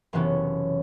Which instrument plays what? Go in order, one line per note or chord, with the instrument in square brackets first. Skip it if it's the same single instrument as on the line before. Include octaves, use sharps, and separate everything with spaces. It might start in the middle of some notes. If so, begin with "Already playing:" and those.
[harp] F#1 C3 E3 B3 C#4